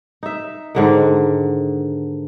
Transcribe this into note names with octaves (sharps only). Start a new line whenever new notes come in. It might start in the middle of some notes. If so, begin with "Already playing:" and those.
D#4 E5
G#2 D3 D#3